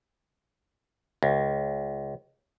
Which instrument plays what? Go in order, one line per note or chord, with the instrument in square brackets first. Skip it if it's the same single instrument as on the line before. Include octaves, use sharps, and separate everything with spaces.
[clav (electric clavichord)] C#2